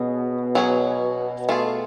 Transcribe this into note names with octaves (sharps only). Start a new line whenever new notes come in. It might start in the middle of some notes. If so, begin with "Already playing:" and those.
Already playing: B2 C#4 G#4
F#3 C#4 G#4 C#5
A3 F4 G#4